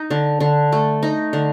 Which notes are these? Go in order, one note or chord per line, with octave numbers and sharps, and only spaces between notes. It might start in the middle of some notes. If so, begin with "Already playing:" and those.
Already playing: D#4
D3
D3
A3
D#4
D3